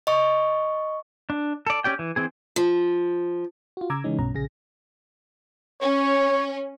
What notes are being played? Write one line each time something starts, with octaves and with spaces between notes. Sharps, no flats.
D#5 C#6
D4
A4 D5
C#4 G4 D5 G5
E3
E3 C4 G#4
F3
F4 F#4
C#3 A#5 D6 E6 G#6
C#3 E3 G#3 C#4 D#4
B1 G2 B2 C#4 A#5
A#1 C#3 G#4 A#6
C#4 C#5